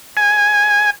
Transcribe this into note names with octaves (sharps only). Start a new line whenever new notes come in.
G#5